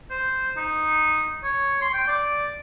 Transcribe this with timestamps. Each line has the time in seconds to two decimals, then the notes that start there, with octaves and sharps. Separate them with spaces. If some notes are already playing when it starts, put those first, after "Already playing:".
0.10 C5
0.57 D#4
1.44 C#5
1.81 C6
1.93 G5
2.08 D5